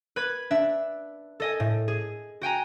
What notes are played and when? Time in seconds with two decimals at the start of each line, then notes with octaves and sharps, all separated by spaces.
0.16 B4 B5 G#6
0.51 D4 E5
1.40 A4 D#5 G#5
1.60 A2
1.88 G#4
2.41 F#4 G5 G#5 A#5